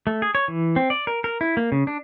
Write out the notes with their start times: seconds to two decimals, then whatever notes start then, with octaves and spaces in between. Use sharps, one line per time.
0.07 A3
0.22 G#4
0.35 C#5
0.48 E3
0.76 C4
0.90 D5
1.07 A#4
1.24 A#4
1.41 E4
1.57 A#3
1.72 C#3
1.87 D4